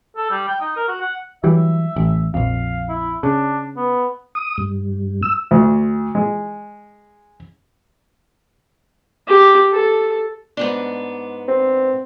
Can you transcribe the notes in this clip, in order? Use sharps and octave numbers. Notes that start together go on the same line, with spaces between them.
A4
G3
G5
D#4
A#4
F#4
F#5
E3 F#3 G3 E5
A1
A#1 F2 F5
E4
C#3 D4
B3
D#6
G2
E6
D2
G#3
G4
A4
G#2 B3 D4
C4